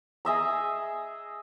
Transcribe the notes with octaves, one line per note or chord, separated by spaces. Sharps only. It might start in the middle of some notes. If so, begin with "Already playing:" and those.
G#4 D#5 E5 A#5